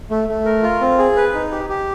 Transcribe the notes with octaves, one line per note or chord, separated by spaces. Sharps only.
A3
A3
A#4
F4
C4
G#4
B4
D#4
G4
G4